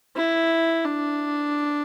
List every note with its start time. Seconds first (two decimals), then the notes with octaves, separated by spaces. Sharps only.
0.16 E4
0.85 D4